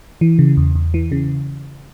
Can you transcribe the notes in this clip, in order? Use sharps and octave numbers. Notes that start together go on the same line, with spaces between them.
E3
C#3
E2
E2
E3
C#3